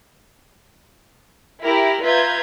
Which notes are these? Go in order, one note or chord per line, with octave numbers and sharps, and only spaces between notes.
E4 G4 A#4
F4 B4 E5 A#5 G6 G#6